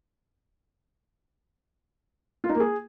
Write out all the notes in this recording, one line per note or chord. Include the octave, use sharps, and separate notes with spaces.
F4
D#4
A#3
G#4